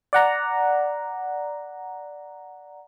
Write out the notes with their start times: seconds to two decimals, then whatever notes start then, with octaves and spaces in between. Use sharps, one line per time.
0.13 D5 F#5 A#5